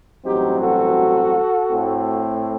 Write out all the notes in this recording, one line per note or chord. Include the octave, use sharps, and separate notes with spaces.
A1 G2 F#3 C4 D#4 G4
F#4 A4
A2 A3 C4